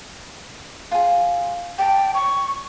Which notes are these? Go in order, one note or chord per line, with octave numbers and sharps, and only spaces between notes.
F4 G#4
D5 G5 A5
C#6